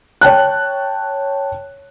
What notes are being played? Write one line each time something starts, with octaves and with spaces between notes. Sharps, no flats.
C#5 G5 A5 F#6